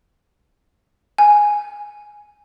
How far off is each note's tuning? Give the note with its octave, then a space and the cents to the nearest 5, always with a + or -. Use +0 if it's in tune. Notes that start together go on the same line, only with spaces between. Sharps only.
G#5 +0